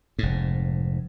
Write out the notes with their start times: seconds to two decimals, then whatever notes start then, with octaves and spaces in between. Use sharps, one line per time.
0.19 F1 G#2